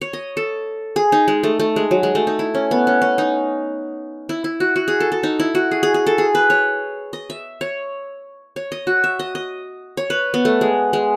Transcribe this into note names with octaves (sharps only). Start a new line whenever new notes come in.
C#5
D#5
A4
G#4
D#4
G#3
A3
A3
G#3
F#3
G#3
A3
D#4
E4
C#4
B3
C#4
C#4
D#4
E4
E4
F#4
F#4
G#4
A4
A4
D#4
E4
F#4
G#4
G#4
G#4
A4
G#4
B4
C#5
D#5
E5
C#5
C#5
D#5
F#4
E5
D#5
D#5
C#5
B4
B3
A3
G#3
G#3